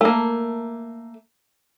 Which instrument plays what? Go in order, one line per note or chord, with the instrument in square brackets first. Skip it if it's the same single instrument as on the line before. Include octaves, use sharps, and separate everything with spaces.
[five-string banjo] A3 A#3